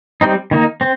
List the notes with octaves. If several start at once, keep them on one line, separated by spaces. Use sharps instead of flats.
G3 C4 D#4
D#3 A#3 D#4
C4